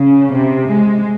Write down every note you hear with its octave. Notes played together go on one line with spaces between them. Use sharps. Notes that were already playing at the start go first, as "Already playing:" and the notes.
Already playing: C#3
C3
G#3